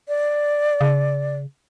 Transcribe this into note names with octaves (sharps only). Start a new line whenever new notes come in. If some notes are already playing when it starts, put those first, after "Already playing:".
D5
C#3